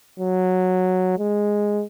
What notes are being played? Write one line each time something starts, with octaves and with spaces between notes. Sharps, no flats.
F#3
G#3